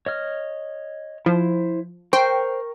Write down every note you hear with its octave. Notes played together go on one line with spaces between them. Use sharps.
C#5 D#5 F6
F3 E4 C5
A#4 C5 G5 C#6